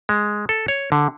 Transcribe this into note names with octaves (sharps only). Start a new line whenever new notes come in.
G#3
A4
C#5
D3